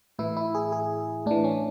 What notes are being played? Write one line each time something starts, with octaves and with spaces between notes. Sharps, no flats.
A2 E3 E4
E4
G#4
G#4
A2 E3 D4
C#4